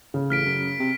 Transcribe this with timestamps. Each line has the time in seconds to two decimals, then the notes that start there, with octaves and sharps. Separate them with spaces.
0.14 C#3
0.30 A1 F6 B6 D7
0.46 F#2
0.79 C3